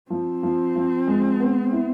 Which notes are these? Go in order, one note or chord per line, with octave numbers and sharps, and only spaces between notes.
F3 C4
F3
F3
G#3
B3
E4